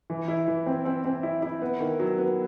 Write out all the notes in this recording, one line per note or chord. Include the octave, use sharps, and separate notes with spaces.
E3
E4
E3
C4
C4
C4
E4
E4
B3
D#3
F#3
B3